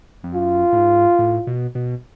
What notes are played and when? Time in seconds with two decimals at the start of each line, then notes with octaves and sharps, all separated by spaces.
0.24 F2
0.34 F#2 F4
0.72 A2
0.77 G#2
1.19 A2
1.47 B2
1.75 B2